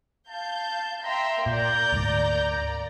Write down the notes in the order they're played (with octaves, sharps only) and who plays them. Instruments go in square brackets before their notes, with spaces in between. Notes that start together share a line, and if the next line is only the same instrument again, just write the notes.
[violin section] F5 G6 [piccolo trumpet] A5
[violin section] E5 G5 C6 [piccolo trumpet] A#5
[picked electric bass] A#2 [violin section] A#3 D5 A#5 [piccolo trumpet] G6
[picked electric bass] D2 G#2